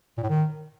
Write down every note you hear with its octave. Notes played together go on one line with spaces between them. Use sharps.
A#2
A2
D#3